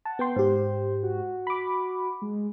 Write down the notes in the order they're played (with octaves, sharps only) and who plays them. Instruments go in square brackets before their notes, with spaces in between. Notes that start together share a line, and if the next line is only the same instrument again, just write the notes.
[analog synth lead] F#5 [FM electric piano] A5
[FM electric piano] B3 G5 C6
[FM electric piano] G#2 G4 [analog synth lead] C5
[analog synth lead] F#4
[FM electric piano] B5 D6
[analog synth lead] G#3